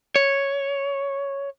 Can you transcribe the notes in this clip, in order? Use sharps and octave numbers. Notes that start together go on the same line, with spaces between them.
C#5